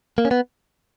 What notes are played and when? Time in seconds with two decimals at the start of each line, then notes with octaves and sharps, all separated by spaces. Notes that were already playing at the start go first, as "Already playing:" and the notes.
0.18 A#3
0.25 C#4
0.31 B3